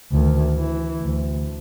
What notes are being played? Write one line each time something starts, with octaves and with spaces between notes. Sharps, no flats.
D2 D#3
E3
D2